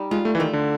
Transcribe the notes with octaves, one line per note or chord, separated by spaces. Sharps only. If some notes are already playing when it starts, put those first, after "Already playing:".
Already playing: G3 D#4
G#3 F4
A3
E3
D#3 A3
D3